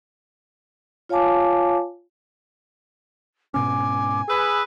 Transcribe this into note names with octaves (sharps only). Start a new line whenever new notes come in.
F4 C#5 F5 G#5 A5 D6
G#2 B2 C#4 G#5 D6
G#4 B4 E6